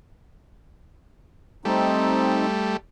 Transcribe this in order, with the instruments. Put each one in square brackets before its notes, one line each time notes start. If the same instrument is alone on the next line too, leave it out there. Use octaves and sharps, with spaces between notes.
[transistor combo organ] G3 A3 [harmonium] C4 D#4